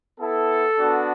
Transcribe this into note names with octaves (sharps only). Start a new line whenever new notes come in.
B3 E4 A4
B3 D4 F#4